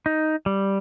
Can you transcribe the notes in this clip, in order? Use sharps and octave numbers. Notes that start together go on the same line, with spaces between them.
D#4
G3